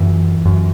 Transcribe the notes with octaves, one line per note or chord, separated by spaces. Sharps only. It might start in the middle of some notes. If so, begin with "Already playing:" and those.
Already playing: F#2 E3
F#2